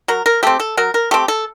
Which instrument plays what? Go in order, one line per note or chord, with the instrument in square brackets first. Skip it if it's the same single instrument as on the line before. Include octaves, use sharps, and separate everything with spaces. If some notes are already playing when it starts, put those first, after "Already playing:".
[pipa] F#3 A#4
A#4
A3 C4 G4
A4
F#3 A#4
A#4
A3 C4 G4
A4